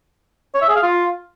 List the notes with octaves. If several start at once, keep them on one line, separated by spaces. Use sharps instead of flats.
C#5
E5
G#4
F5
F4